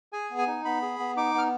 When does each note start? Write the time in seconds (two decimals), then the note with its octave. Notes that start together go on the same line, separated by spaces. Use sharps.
0.13 G#4 G#5
0.31 B3
0.38 G#5
0.47 D#4
0.65 B3 B5
0.82 G#4
0.99 B3
1.16 D#4 D6
1.35 B3 F6